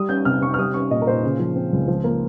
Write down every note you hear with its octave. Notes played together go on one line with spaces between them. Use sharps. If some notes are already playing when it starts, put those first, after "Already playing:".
Already playing: G3 D#6
C#4 G6
C3 F6
C3 C#6
F6
G3 D#6
C#4 C#6
A#2 D#5
A#4
A#2 C5
C#3
F3
C4
C#2
F3
A#3